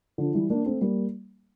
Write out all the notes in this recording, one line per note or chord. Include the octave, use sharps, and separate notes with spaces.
D3 F3
E3 G3
A#3 D4
A3 C4
G3 A#3